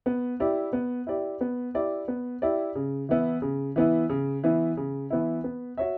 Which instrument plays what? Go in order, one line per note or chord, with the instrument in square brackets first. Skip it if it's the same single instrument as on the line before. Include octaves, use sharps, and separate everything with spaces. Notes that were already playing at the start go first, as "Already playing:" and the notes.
[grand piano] B3
E4 G4 D5
B3
E4 G4 D5
B3
E4 G4 D5
B3
E4 G4 D5
C#3
E3 B3 E4
C#3
E3 B3 E4
C#3
E3 B3 E4
C#3
E3 B3 E4
B3
F#4 C#5 E5